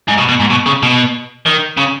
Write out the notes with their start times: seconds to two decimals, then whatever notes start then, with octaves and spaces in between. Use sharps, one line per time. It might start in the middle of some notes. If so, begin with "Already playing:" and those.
0.08 G#2
0.18 B2
0.29 B2
0.40 G#2
0.50 B2
0.66 C#3
0.83 B2
1.46 D#3
1.78 C#3